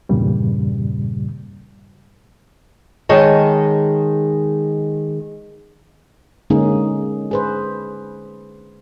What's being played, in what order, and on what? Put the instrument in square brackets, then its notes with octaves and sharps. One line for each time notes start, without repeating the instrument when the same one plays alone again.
[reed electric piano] E2 G2 A#2 C#3 G3
[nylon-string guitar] D#3 G#3 G#4 C#5 D#5 A5
[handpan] D3 G#3 A#3 C#4 D#4 G#4
G#4 B4 C5